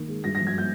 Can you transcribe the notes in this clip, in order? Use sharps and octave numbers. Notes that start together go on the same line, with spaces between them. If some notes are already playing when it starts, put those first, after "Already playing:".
Already playing: D#3 A#3
G#3
G2 A#6
A#6
F3
G#6
A#3 G6